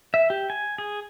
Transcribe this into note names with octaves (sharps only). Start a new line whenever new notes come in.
E5
G4
G#5
G#4